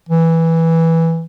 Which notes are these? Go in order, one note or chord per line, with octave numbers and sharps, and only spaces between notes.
E3